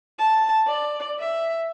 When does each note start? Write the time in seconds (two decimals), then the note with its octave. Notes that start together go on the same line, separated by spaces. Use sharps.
0.18 A5
0.67 D5
1.19 E5